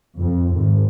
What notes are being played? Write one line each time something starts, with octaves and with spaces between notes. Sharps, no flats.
F2
G#1